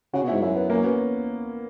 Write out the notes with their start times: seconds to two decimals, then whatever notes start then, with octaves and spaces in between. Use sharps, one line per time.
0.14 C#3 F#4
0.23 B2
0.28 G#2 E4
0.41 F#2 E4
0.55 B3
0.70 F#2 A#3
0.77 C#4
0.84 B3